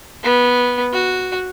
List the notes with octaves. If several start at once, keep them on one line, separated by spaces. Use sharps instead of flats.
B3
F#4